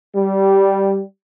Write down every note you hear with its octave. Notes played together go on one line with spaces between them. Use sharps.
G3